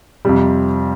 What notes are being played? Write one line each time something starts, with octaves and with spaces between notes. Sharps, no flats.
F2 C3 G3